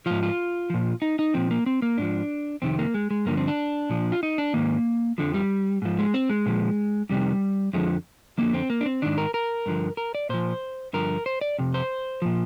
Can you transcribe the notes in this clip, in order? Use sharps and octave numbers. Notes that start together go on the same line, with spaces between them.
G#2 F3 F4
F4
A#2 F3
D#4
D#4
A#2 F3 C4
A#3
C4
A#3
G#2 F3 D4
F2 C3 D#3 C4
A#3
G#3
G#3
G2 D3 F3 A#3
C4
D4
A#2 F3
F4
D#4
D4
G#2 D#3 A#3
F2 D3 F3
G3
G#2 F3
G#3
C4
G#3
A#2 F3
F2 C3 D#3 G3
F2 D3 F3 G#3
F2 D3 F3 A#3
C4
A#3
D4
C4
G#2 D#3 D4
A#4
A#4
G2 D3 F3
A#4
D5
A#2 F3 C5
G2 D3 F3 A#4
C5
D5
F2 C3
C5
A#2 F3